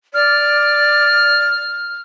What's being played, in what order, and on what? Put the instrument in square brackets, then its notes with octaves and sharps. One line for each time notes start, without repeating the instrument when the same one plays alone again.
[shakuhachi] D5 [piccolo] F6